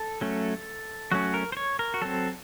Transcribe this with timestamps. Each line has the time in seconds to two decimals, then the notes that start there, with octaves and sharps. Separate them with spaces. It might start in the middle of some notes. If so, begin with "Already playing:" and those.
Already playing: A4
0.21 F#3 A3 C#4
1.12 F#3 A3 C#4 F#4
1.34 A#4
1.52 C5
1.57 C#5
1.79 A#4
1.94 F#4
2.02 F#3 C4 A4